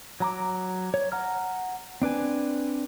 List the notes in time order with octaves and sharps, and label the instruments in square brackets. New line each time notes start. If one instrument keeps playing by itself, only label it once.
[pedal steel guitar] F#3 A#5 D6
C#5
F#5 A#5 F6
C4 D4 B4 G#5